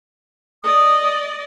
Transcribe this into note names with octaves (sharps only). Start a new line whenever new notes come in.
D5 D#5 D#6